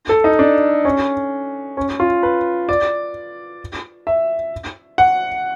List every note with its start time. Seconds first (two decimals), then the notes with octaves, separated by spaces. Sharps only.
0.09 A4
0.24 D#4
0.39 D4
0.85 C#4
1.77 C#4
2.00 F4
2.23 B4
2.69 D5
4.07 E5
4.98 F#5